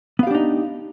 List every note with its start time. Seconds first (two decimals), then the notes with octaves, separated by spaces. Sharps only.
0.19 B3
0.23 F5
0.27 G4
0.31 D4
0.35 D#4